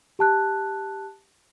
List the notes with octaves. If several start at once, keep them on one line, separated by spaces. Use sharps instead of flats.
G4 A5 F#6